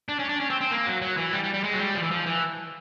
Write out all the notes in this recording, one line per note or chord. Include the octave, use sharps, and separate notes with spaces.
D4
C#4
D4
C#4
C4
C4
A#3
F#3
F#3
E3
G3
G3
G3
G#3
F#3
G3
F3
E3
F3
E3